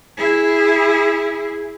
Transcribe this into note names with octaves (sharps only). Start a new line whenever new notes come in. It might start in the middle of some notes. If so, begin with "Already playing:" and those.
E4 G#4